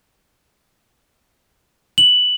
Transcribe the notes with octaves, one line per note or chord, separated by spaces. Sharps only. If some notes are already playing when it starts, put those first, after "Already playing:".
F#7